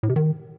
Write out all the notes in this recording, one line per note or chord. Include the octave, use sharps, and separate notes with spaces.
A2
C3
D#3